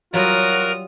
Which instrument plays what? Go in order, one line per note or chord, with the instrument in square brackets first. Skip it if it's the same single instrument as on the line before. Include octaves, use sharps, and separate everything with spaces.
[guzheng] F#3 G3 [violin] F4 D#6 [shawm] F#4 [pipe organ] A#4 A#5